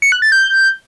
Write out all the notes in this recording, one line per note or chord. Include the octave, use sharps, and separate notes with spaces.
C#7
F#6
A6
G6